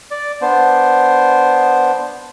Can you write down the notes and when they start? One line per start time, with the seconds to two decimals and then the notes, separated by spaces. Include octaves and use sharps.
0.11 D5
0.42 B3 D4 C5